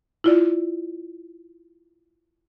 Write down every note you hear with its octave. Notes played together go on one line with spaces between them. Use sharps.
E4 F4 D5